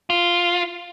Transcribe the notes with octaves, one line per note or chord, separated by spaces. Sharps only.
F4